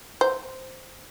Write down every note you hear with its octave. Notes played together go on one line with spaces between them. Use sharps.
C5